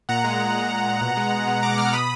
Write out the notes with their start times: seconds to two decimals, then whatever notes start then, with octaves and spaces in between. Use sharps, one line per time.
0.09 A#2 F#5 A#5
0.24 G#3
0.40 A#2
0.55 A#2
0.70 G#3
0.86 A#2
1.01 B2
1.17 G#3
1.32 G#3
1.47 B2
1.62 B2 A#5 D6
1.78 G#3 D6 F6
1.93 B2 B5 D#6